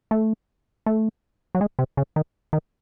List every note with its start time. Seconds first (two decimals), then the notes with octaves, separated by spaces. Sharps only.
0.11 A3
0.86 A3
1.55 F#3
1.61 G#3
1.79 C3
1.97 C#3
2.16 D#3
2.53 D#3